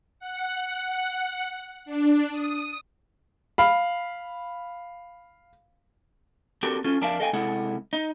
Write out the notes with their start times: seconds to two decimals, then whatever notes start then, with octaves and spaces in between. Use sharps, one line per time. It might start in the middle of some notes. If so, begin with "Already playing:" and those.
0.20 F#5
1.85 D4
2.32 D#6
3.58 F5 B5
6.63 C4 D4 F#4 G4 A4 A#4
6.84 C#4 F4 A4
7.01 F2 D4 A#4 E5 F5 A5
7.20 A4 D#5 F5 G5 G#5
7.33 C3 G#3 E4 A4 F#5
7.93 D#4